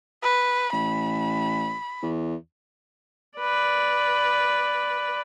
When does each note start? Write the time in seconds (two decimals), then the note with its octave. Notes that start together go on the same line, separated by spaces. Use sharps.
0.23 B4
0.73 A1 B5
2.02 E2
3.39 B4 D5